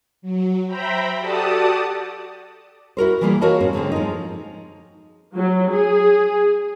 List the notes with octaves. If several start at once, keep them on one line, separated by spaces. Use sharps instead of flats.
F#3
C5 E5 G5 A#5 B5
F#4 G4 A4 D5 A5 D#6
E4 F#4 A#4 C5
E3 G3 A#3 D#4 F4 G#4
A#3 F#4 A#4 C#5 D#5 A5
G#2 C4 C#4
G#2 D3 G#3 C4
F3 G#3 D#4
F#3
G#4